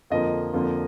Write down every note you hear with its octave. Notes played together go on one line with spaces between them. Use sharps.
F2 D3 F3 A#3 D#5
F2 D3 F3 A#3